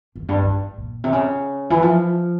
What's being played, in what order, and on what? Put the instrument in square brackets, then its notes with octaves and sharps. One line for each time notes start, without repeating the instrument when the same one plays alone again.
[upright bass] F2
G2
G#2
A#2
C3
C#3
E3
F3